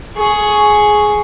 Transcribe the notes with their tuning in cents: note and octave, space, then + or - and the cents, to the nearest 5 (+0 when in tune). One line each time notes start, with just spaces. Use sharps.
G#4 +10 C#6 +0